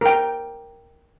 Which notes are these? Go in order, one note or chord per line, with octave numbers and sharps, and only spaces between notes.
A#4 G5